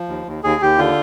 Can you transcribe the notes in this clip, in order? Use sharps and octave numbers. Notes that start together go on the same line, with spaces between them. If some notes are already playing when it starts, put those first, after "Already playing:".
Already playing: F3
D#2
D#2
D#2 G#4
D#2 G4
D3 F4